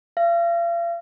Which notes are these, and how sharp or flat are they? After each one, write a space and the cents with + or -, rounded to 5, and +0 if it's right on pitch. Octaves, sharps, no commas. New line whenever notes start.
F5 -40